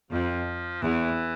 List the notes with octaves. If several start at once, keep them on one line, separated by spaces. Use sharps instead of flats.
F2 F3
E2 E3